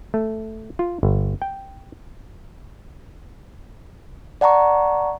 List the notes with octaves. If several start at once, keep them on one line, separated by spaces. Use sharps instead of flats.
A3
F4
G1
G5
D5 F#5 A5 A#5 C#6